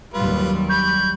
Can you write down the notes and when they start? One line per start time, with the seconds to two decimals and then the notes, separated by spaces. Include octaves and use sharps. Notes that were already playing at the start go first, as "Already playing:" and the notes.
0.14 D#2 F#3 G3 F4 B4
0.69 B5 C#6 G6